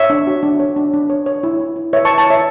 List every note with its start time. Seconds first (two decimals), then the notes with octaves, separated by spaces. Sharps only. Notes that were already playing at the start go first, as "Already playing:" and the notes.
Already playing: C#5 E5
0.10 D4
0.27 F#4
0.43 D4
0.60 C#5
0.76 D4
0.94 D4
1.10 C#5
1.26 C#5
1.43 E4
1.60 E4
1.76 E4
1.93 B4 C#5 E5
2.05 A5 C#6
2.10 E4
2.18 A5 C#6
2.27 E4 C#5 E5